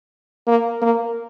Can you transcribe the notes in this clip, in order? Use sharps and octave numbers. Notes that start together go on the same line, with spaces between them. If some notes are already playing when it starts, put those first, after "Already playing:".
A#3
A#3